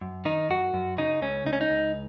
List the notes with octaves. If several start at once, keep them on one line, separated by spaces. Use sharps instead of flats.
F#2
D#3 D#4
F#2 F#4
F#2
C#3 D#4
C#2 C#4
C#2 D#4
C#4
D#4
C#2